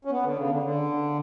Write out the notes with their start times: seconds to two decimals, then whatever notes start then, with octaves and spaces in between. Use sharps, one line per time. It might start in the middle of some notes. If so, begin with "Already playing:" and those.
0.05 C#4
0.11 B3
0.23 D3
0.37 C#3
0.50 D3
0.62 D3